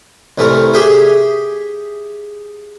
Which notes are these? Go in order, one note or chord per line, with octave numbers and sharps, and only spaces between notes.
C2 E3 A3 A#4
G4 G#4 E5 G5 G#5